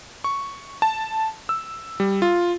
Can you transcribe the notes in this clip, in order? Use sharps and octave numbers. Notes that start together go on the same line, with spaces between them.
C#6
A5
E6
G3
F4